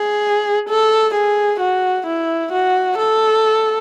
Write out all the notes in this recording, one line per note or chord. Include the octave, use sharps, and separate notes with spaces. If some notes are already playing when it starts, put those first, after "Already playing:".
Already playing: G#4
A4
G#4
F#4
E4
F#4
A4